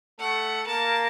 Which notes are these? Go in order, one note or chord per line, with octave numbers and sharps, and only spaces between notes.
A3 A4 F#5
A#3 A#4 A5